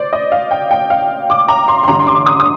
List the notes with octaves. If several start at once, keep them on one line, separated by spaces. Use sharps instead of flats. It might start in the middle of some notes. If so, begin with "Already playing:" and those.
Already playing: C5 D5
D#5
F5
G5
G5
F5
D6
A#5
C6
C6
A1 G2 D3 A#5
C6
D6
D#6
D#6